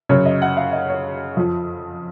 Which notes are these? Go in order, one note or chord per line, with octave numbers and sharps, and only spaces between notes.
F#2 C#3 F#3 C#5
D#5
F#5
F5
D#5
C#5
F2 F3